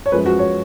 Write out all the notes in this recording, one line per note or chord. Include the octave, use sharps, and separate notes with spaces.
C#5
F#2 F3 G#3 B4
F#4
C#5